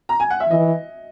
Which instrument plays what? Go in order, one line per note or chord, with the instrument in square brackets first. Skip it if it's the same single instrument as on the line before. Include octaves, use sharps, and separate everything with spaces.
[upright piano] A#5
G#5
F#5
E5
[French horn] E3 [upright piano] D#5